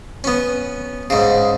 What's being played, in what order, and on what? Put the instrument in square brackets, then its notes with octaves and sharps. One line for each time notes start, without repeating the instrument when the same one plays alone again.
[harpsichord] B3 C#4
G#2 C#3